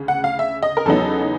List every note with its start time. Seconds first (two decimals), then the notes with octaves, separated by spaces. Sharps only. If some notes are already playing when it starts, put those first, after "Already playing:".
Already playing: D2 C#3
0.08 F#5
0.24 F5
0.39 E5
0.63 D#5
0.77 A#4
0.85 E2 C#3 F#3 B3 D#4 A4